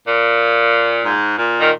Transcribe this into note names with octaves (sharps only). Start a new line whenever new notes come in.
A#2
G#2
A#2
D#3